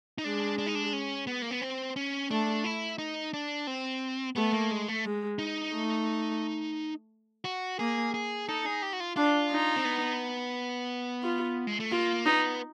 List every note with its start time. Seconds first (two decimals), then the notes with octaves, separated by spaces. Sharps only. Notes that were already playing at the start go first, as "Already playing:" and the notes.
0.18 D#4
0.24 G#3 D4
0.58 D4
0.66 D#4
0.75 D4
0.93 C#4
1.27 B3
1.42 A#3
1.51 B3
1.61 C4
1.96 C#4
2.30 A3 D4
2.64 E4
2.98 D#4
3.34 D4
3.67 C4
4.36 A3 B3
4.53 A#3
4.71 G#3
4.88 A3
5.05 G#3
5.39 D#4
5.73 A3
7.44 F#4
7.79 A#3 G#4
8.14 G#4
8.48 D#4 A4
8.66 G#4
8.82 G4
8.93 F#4
9.00 F4
9.16 D4 F4
9.52 D#4
9.76 C4
9.85 B3
11.23 F4
11.67 G#3
11.80 A3
11.91 A#3 F4
12.26 B3 D#4